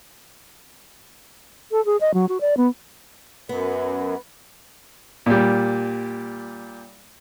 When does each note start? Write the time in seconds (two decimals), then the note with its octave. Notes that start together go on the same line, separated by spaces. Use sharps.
1.72 A4
1.85 G#4
2.01 D#5
2.14 F#3
2.29 F#4
2.41 D5
2.57 B3
3.49 F#2 B3
5.26 A#2 G3